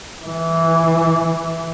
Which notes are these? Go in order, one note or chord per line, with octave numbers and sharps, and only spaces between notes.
E3